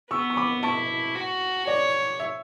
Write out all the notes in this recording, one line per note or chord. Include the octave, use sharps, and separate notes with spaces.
B3 C#6 E6
C#6
B5 D6
E4 A5 C#6
F#4
C#5 D5
E5